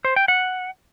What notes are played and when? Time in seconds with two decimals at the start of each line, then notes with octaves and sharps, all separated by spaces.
0.05 C5
0.16 G5
0.28 F#5